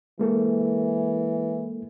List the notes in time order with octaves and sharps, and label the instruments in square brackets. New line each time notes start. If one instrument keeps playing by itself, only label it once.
[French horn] E3 [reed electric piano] G#3 A#3 A4